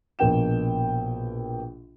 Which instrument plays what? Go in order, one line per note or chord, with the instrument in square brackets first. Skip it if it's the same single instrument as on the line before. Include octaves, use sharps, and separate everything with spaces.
[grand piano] A#1 B2 A#3 G5 E7